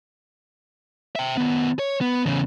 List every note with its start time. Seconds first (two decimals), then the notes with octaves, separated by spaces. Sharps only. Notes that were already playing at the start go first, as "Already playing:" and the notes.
1.15 E5 G5
1.37 D#3 B3
1.79 C#5
2.01 B3
2.26 E2 C#3